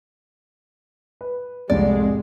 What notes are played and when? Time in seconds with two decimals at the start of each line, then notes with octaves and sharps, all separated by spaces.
1.21 B4
1.70 C2 F2 A2 G#3 D5